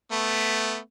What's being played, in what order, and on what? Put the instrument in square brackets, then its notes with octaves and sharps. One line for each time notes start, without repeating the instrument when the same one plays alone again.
[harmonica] A3 B3